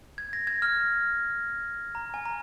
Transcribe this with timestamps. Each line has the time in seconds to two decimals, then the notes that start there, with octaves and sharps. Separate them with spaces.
0.18 G#6
0.33 A#6
0.47 G#6
0.62 F6
1.95 A#5
2.14 G#5
2.25 A#5